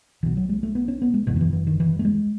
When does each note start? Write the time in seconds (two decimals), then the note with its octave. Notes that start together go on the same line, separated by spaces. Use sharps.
0.23 B1 B2 E3
0.37 F#3
0.49 G#3
0.63 A3
0.75 B3
0.88 C#4
1.02 B3
1.14 G#3
1.27 F#1 E2 B2
1.36 D#3
1.41 E3
1.53 E3
1.67 D#3
1.80 E3
1.99 A3
2.05 G#3